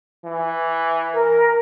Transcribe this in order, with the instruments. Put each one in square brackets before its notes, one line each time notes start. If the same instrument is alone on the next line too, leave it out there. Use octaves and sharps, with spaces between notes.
[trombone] E3
[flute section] A#4